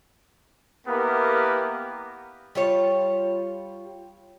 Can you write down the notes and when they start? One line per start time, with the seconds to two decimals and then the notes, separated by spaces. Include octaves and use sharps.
0.87 A#3 B3 E4 G4 A#4 B4
2.55 G3 F4 C#5